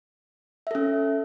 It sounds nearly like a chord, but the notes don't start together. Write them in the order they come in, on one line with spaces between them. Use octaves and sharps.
E5 A4 C#4